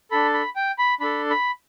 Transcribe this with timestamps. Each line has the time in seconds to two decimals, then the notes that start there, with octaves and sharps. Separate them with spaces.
0.11 D4 A4 B5
0.34 B5
0.56 G5
0.79 B5
1.01 D4 A4 B5
1.30 B5